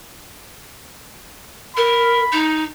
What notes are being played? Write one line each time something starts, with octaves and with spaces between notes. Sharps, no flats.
A#4 B5
D#4